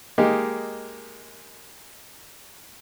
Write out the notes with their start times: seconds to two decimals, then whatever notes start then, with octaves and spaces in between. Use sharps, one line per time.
0.18 G#3 A#3 D#4 G4